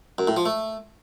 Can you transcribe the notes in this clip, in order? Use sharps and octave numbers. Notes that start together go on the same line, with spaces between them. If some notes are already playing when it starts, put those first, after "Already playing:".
F#2
A2
F3
A3